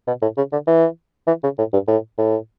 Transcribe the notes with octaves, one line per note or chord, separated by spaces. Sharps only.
B2
A2
C#3
D3
E3
E3
C#3
A2
G2
A2
A2